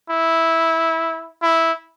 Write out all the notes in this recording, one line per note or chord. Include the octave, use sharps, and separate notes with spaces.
E4
E4